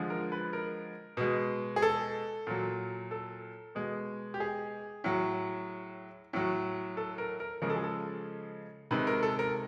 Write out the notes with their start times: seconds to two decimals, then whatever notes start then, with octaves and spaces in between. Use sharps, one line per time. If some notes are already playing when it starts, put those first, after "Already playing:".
Already playing: D3 F3 G#3
0.10 A#4
0.32 B4
0.53 A#4
1.17 B2 G#3
1.76 G#4
1.82 A4
2.47 A#2 F#3
3.11 A4
3.75 B2 G#3
4.34 G4
4.40 G#4
5.04 A2 F#3
6.33 A2 F#3
6.97 A4
7.18 A#4
7.40 A#4
7.62 C#3 F3 G#3 A#4
7.70 A4
7.76 G#4
7.84 A4
8.91 C3 D#3 G#3 B4
9.07 A#4
9.23 A4
9.39 A#4